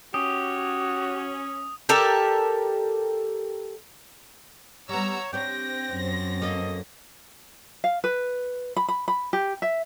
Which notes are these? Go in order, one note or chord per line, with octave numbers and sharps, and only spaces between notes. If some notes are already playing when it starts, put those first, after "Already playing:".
C#4 F#4 G4 D#6
G4 A4 A#4 D5
G3 B3 C#5 F#5 A#5 E6
C4 D4 G4 C#5 G5 A#6
F#2
A#3 A4 D#5
F5
B4
B5
B5
B5
G4
E5